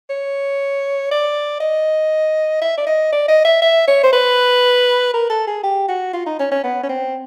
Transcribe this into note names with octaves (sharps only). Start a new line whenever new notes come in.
C#5
D5
D#5
E5
D5
D#5
D5
D#5
E5
E5
C#5
C5
B4
A#4
A4
G#4
G4
F#4
F4
D#4
C#4
C#4
B3
C#4
C4